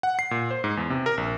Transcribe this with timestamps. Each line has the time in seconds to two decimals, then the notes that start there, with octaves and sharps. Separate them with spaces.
0.03 F#5
0.19 C7
0.31 A#2
0.51 C5
0.64 G#2
0.77 E2
0.90 C3
1.06 A#4
1.17 A#1